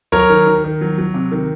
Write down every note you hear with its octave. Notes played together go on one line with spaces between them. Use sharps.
F#3 A#4 C#5
D#3
D#3
D#3
F#3
F#3
C3
D#3